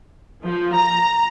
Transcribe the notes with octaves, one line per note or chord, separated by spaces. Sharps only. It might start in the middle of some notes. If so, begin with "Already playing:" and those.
F3
A#5